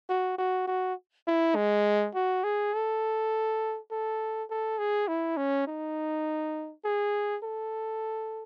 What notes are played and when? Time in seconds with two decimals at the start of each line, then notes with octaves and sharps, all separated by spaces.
0.09 F#4
0.38 F#4
0.67 F#4
1.27 E4
1.56 G#3
2.15 F#4
2.44 G#4
2.73 A4
3.91 A4
4.50 A4
4.78 G#4
5.08 E4
5.37 C#4
5.67 D#4
6.85 G#4
7.43 A4